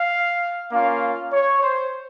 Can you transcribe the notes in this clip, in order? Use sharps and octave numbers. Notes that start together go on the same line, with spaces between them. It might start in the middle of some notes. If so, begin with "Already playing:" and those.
Already playing: F5
A#3 C#4 F4 F5
C#5
C5